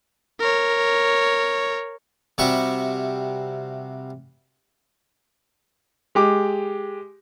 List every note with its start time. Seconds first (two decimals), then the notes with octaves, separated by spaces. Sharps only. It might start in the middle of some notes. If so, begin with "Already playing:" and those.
0.40 A#4 C#5
2.38 C3 G3 F#4 E5 C#6
6.15 G#3 G4 D6